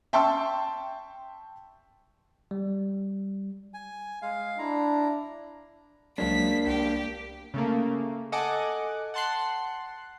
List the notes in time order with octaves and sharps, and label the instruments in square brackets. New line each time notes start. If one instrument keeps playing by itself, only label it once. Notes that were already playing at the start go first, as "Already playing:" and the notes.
[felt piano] E5 G5 A5 C6 C#6 E6
[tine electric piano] G3
[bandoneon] G#5
G#3 F5
[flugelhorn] D4 [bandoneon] E4 A#5
[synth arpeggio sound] C#2 F#3 G#3 [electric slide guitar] A#3 D4 [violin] B6
[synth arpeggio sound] C2 B6 [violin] G4
[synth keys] C#3 A3 A#3
A4 D#5 F#5 G#5 D6
F#5 A5 C6 F#6 C7